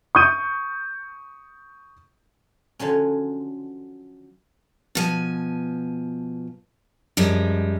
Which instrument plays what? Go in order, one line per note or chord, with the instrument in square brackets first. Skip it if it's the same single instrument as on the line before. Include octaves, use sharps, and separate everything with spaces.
[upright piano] C#6 D#6 G6 D#7
[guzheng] D3 F3 F#3 C#4
[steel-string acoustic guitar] B2 F3 G#5
F#2 F3 G3 G#3